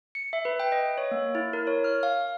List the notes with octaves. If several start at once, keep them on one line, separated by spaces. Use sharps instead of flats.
C#7
E5
B4
G5
D#5
C#5
A#3
E4
A#4
C#5
F6
F5